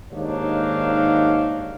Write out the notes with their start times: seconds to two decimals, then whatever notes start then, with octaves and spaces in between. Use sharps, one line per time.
0.13 D#2 G#2 D4 D#4 C#5 F5